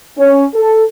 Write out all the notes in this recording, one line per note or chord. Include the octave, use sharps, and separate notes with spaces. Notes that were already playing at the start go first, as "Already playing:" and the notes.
C#4
A4